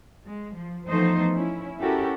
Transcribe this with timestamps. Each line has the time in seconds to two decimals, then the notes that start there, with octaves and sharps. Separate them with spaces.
0.24 G#3
0.54 F3
0.87 E3 F3 A3 B3 D#4 C5
1.32 C#4 E4
1.80 C#4 E4 F#4 G4 A4 A#4